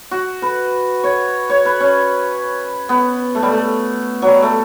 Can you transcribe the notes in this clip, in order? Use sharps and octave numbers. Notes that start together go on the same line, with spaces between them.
F#4
B4
C#5
C#5
B4
C#4
B3
A3
G3
A3
F#3 G3
A3